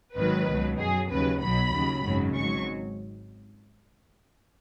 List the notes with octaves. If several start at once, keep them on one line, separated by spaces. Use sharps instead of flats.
G#1 G#2 D#3 F#3 B4
C#2 B2 F#3
F#2 F#3 G#4
D#2 C#3 F#3 B4
B1 B2 F#3 B5
D#2 C#3 F#3
G#1 F#2 C#3 F#3
G#1 G#2 F#3 C#6